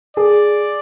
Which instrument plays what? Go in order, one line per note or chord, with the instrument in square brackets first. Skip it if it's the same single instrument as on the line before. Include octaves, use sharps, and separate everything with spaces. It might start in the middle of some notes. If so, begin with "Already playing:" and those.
[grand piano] G#4 [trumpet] D5